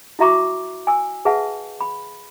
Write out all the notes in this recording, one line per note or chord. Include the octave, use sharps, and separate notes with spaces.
E4 F#4 E5 A#5 C#6 D6
G#5 E6
G#4 B4 E5 F#5 A5
B5